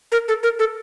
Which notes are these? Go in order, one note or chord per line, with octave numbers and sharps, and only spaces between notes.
A#4
A4
A#4
A4